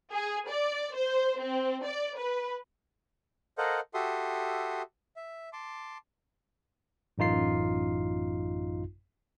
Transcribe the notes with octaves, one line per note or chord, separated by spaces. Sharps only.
G#4
D5
C5
C4
D5
B4
A4 A#4 C5 D#5 F5 F#5
F#4 G4 A4 E5 C6 D#6
E5
A5 C6 D6
A1 F#2 D#4 F4 C7